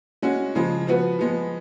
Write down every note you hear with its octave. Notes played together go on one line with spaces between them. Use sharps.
G#3 C#4 F#4
C#3 F3 G#3
F3 B3 F#4 B4
F3 G#3 B3